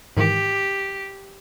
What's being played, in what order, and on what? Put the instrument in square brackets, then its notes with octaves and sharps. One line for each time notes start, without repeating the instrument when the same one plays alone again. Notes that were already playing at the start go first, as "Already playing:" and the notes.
[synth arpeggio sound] G#2 D#3 E3 [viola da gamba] G4